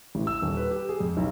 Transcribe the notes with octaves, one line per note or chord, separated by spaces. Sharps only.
A1
E6
D#1
B4
G4
G#4
F2
B1